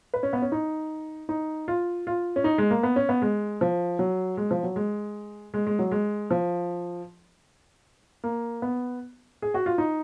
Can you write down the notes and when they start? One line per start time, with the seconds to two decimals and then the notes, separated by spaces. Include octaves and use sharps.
0.14 B4
0.23 C#4
0.33 B3
0.42 C#4
0.52 D#4
1.29 D#4
1.68 F4
2.07 F4
2.36 C#4
2.44 D#4
2.58 G#3
2.70 A#3
2.83 B3
2.96 C#4
3.09 B3
3.22 G#3
3.61 F3
3.99 F#3
4.37 G#3
4.51 F3
4.63 F#3
4.76 G#3
5.54 G#3
5.67 G#3
5.79 F#3
5.91 G#3
6.31 F3
8.24 A#3
8.62 B3
9.42 G#4
9.54 F#4
9.66 F4
9.78 D#4